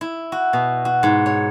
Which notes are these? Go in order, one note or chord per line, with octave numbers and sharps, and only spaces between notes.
E4
F#4
B2
F#4
G#2
C#5